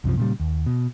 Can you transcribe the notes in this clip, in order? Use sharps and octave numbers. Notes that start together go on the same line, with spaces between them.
C2 F#2 C3 F3
A#2 C#3 G3
D#2
B2